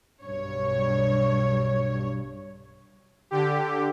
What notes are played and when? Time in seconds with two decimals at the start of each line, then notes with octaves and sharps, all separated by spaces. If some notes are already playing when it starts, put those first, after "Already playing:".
0.24 B1 G2 C#5
3.31 D3 G4